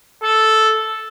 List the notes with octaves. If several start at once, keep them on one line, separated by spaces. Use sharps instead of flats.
A4